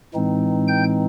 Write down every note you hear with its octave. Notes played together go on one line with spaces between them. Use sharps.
A2 E3 G#3 C4 D#4
G5 G6